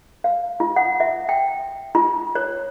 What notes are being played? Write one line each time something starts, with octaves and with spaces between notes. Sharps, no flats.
F5
F4
F#5
E5
G5
F4
C#5